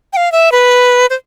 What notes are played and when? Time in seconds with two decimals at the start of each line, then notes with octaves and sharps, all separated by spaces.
0.13 G5
0.17 F5
0.32 E5
0.52 B4
1.10 C5